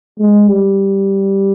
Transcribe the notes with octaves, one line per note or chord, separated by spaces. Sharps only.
G#3
G3